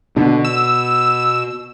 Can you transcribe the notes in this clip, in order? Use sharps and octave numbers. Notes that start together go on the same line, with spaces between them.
B2 D3
E6